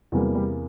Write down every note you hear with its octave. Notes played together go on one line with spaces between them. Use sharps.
E2 C3 E3 F#3 G3 A#3 F#4
G3 G4